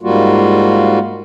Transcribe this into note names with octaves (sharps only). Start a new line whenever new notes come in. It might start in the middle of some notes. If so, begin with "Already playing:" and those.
G#2 G3 A#3 F4 F#4